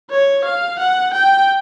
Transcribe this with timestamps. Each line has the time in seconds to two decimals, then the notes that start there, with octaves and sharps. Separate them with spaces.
0.11 C#5
0.45 F5
0.79 F#5
1.13 G5